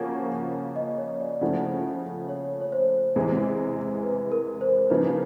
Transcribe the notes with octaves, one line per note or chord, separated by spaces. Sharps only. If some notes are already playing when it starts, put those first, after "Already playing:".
Already playing: C#3 F3 A#3 C#4 F#4 F#5
D#5
C#5
D5
C#3 F3 A3 F#5
C#5
C#5
C5
E2 C3 E3 G#3
B4
A#4
C5
C#3 F3 A#3 D#4 B4